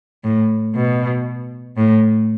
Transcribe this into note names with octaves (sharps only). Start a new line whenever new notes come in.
A2
B2
A2